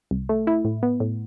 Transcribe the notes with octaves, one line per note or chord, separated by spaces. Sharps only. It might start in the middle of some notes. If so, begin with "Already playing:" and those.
C2
A3
E4
A2
B3
A2